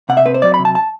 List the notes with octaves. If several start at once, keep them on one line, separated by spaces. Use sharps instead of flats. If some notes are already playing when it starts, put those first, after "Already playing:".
C3 F#5
E5
C4 B4
C5
F#3 D5
B5
C3
A5
A5